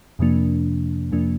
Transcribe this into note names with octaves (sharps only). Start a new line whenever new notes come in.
F2 C3 F3 A#3 D4
F2 C3 F3 A#3 D4